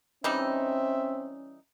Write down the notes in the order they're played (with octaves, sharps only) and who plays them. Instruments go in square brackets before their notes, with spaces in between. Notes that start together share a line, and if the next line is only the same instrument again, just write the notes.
[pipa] E3 G3 D#4 [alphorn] C4 [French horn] C#4 [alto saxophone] E5